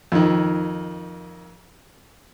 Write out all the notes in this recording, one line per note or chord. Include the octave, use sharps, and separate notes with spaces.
F2 D#3